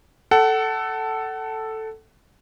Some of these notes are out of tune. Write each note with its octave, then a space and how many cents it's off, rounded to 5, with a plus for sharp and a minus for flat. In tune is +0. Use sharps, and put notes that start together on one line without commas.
A4 +0 F#5 +30